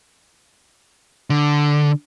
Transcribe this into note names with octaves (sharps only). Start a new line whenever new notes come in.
D3